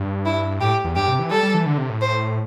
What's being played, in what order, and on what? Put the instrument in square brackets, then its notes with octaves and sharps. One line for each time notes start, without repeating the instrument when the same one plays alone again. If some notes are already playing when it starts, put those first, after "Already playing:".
Already playing: [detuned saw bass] G2
[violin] E4
[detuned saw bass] A2 [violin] G4
[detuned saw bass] E2
[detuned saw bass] G2 [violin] G4
[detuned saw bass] C3
E3
[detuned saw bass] G3 [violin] A4
[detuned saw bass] G3
E3
D3
C3
A2
[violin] C5